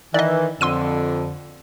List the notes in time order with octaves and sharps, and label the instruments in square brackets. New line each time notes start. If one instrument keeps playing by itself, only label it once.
[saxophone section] D#3 E3 [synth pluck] D5 D#5
[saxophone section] F2 D3 [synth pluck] C6 E6 D#7